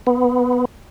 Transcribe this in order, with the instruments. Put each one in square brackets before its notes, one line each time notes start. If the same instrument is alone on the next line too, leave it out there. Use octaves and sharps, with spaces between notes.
[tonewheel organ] B3